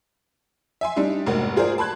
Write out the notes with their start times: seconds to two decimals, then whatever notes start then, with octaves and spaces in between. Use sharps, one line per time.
0.81 E5 G#5 C6
0.96 G3 D4 D#4 G4
1.26 F1 G#2 A#3 F#4
1.57 F4 G#4 A#4 C5 D5
1.78 A5 B5 C6 F#6 G#6